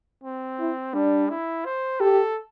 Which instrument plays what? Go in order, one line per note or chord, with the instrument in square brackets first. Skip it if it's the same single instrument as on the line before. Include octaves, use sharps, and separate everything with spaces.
[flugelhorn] C4
[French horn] E4
[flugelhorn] G3 [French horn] D4
[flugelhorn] E4
C5
[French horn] G4 [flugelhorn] A4